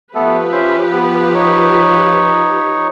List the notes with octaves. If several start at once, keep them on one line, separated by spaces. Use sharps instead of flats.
F3 A3 B3 G4 A4 B4
C#4 C5 E5
B3
D#4 C#5